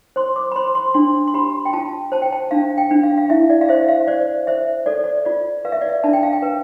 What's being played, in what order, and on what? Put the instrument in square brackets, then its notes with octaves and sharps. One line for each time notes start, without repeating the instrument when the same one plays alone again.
[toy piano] C5 C6
D6
B5
C5 C6
C6
D4 C6
C6
G4 B5
G5
F4 A5
C5 A5
G5
A5
D4 F5
G5
D4
F5
F5
E4 E5
D5
F5
C5 E5
F5
C5 D5
C5 E5
A4 D5
D5
F4 D5
B4 F5
E5
D5
E5
D4 A5
G5
F5
G5
B4